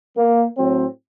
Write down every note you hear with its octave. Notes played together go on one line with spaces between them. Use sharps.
A#3
A2 F#3 C4